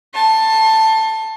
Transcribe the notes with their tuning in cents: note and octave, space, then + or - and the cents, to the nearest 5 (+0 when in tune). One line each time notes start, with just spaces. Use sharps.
A5 +10 C6 +40